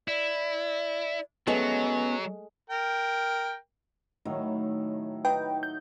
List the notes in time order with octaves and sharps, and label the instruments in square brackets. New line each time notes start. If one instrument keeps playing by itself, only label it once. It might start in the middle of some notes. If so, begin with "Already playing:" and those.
[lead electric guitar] E4 [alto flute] D5
[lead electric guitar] F#3 [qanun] G#3 A3 C#6 [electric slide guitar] B3 C#4 [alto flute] B4
[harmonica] A#4 G5
[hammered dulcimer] A2 D#3 F#3
[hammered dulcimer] D#4 [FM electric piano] B4 G5
[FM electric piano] G6